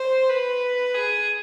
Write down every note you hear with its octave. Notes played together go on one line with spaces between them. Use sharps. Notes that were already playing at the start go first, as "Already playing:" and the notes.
Already playing: C5
B4
G#4